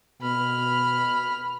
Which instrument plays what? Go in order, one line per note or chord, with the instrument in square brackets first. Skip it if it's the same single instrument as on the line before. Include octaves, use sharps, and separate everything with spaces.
[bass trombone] B2 [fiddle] B5 F6